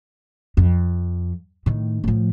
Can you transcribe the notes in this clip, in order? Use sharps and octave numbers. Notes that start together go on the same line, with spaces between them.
F2
A2 D#3
A2 F3